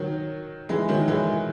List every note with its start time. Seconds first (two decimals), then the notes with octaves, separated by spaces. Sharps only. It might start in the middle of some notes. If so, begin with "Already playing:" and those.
Already playing: D#3 F#3
0.69 E3 G#3
0.88 D#3 F#3
1.08 E3 G#3